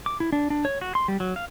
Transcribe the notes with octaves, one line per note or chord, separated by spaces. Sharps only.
D6
E4
D4
D4
C#5
F#4
C6
G3
F#3
F5